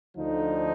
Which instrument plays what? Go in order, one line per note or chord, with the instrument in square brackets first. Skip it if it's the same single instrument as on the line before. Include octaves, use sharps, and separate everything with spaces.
[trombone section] D2 D3 F3 D#4